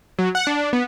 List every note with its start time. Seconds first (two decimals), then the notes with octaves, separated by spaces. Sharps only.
0.19 F#3
0.35 F#5
0.47 D4
0.73 B3